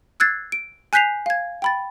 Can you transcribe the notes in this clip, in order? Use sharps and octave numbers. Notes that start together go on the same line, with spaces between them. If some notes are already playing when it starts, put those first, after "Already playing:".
E6 F#6 G#6 A6 C7
D7
G#5 F#6 G6 B6 C7 F7
F5 G#6
G5 B5 A6